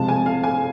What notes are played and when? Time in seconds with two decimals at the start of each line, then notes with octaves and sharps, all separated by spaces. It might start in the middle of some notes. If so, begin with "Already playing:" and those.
Already playing: C3 F3 G#3 A5
0.09 G#5
0.26 F5
0.44 G#5